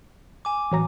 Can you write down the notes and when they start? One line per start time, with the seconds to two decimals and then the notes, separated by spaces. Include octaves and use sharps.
0.45 G#5 D6
0.72 A1 F#3 A#5